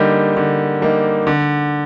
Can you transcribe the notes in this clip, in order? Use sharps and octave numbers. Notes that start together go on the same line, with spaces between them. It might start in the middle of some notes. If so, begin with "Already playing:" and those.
Already playing: D3 G3 A#3 D#4
D3
G3 A#3 D#4
D3